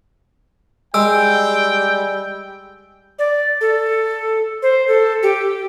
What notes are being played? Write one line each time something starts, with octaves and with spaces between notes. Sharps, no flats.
G3 G#3 G5 E6
D5
A4
C5
A4
G4